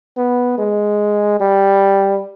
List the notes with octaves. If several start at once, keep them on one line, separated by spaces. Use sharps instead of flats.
B3
G#3
G3